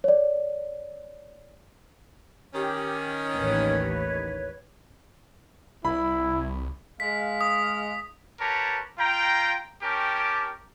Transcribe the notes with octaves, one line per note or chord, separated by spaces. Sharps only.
C#5 D5
D#3 C#4 G4
A1 D#2 B4 C#5
C2 E4 B5
G#3 F5 B6
D#6
G4 A#4 B4 C#5 A5
F4 G5 A#5
C#4 G4 A#4 G5 A5 D6